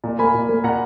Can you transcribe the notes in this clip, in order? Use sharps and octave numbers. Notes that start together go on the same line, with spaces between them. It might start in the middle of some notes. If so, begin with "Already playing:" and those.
A#2
A#3 G#5 B5
A#2
A#3
A#2 F#5 A#5